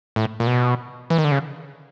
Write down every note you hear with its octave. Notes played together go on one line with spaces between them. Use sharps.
A2
A#2
B2
E3
D#3
D3
C#3